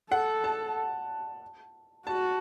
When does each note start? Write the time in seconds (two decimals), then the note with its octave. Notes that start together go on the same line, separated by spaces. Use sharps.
0.11 A4 F#5
0.44 A5
2.07 F#4 A5